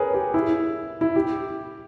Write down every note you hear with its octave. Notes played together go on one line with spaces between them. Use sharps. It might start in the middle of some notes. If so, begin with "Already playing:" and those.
Already playing: G#4 A#4 B4 C#5
G4
E4
E4
G4